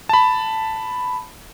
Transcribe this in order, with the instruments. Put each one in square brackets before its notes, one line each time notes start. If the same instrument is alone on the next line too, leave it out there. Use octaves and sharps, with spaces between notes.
[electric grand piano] A5 B5